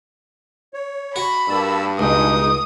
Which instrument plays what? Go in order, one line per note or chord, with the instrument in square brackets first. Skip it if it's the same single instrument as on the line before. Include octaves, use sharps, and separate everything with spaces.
[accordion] C#5
[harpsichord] F#4 [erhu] B5
[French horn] G2 [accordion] A#3 A5 E6
[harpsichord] C#2 [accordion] B2 G#3 D#4 [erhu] D#6